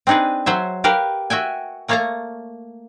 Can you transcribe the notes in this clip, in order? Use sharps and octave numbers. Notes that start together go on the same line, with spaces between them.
C4 D4 D#4 G#4 B4
F#3 C5 C#5 E5
G4 A#4 B4 F5
F#4 E5 G5 G#5
A3 A#3 C#5 F5 A5 A#5